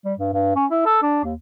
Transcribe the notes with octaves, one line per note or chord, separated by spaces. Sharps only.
G3
G2
G2
C#4
E4
A4
D4
D#2